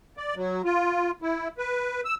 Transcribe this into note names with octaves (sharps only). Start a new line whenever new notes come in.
D5
F#3
F4
E4
B4
E6